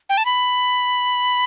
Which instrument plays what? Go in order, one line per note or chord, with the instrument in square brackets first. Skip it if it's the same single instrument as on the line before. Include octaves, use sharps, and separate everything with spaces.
[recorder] G5
A5
B5